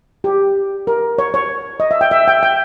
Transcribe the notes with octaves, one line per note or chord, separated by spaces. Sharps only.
G4
A#4
C#5
C#5
D#5
E5
G5
E5
G5
G5